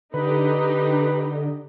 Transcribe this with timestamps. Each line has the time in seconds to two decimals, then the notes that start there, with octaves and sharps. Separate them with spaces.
0.14 D3 D#4 G4 B4